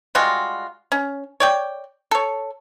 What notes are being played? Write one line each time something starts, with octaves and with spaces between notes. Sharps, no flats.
G3 G#3 F4 F#4
C#4
C#5 D5 G5
A4 C#5